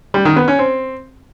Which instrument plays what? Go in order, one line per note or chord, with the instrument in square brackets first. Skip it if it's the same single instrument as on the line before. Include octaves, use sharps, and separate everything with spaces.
[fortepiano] G3
D#3
B3
C#4
C4